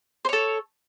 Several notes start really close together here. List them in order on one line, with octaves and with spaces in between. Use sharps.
C5 C#5 A4